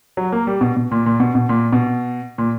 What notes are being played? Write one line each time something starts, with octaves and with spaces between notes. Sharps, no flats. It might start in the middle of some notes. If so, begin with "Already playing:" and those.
F#3
A#3
G3
B2
B2
A#2
A#2
B2
B2
A#2
B2
A#2